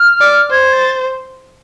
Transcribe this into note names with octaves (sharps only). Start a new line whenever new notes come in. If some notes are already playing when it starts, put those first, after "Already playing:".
Already playing: F6
D5
C5 G#6
A6